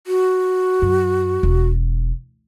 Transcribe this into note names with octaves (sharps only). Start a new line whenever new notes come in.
F#4
F#2
E1